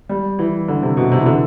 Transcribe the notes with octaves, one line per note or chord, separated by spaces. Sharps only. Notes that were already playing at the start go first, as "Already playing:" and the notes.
G3
E3
D3
C3
B2
C3
E3
D3